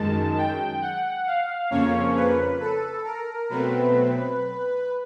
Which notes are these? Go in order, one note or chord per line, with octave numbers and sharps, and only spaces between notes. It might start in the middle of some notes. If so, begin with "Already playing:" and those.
Already playing: F#2 D#3 G#3 A5
G5
F#5
F5
F2 C#3 F3 A#3 C#4 C#5
B4
A4
A#4
B2 F#3 A3 C4 B4